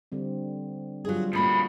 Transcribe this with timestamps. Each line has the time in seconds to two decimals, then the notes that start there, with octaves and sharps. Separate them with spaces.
0.12 D3 G3 C4
1.05 F#3 G3 F4 G#4
1.33 F2 A#2 G3 A3 A#3 C#4 F#4 B5